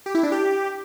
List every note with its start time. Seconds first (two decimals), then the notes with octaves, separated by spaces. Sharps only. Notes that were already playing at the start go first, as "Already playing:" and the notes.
0.06 G4
0.15 E4
0.23 D4
0.32 G4